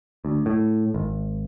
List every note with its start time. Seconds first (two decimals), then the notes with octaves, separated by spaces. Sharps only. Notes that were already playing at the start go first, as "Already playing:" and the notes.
0.25 D2
0.46 A2
0.94 G#1